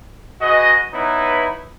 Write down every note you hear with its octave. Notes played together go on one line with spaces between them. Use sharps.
F#4 G#4 B4 D#5
B3 D#4 E4 B4 C#5